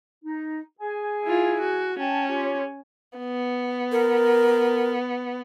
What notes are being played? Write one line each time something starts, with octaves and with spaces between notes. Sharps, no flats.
D#4
G#4 G#5
E4 F4
F#4
C#4 G5 A5
F4 G4 C#5
B3
A#4